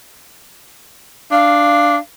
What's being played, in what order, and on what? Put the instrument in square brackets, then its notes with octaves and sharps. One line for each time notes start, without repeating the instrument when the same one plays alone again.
[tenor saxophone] D4 [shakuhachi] F5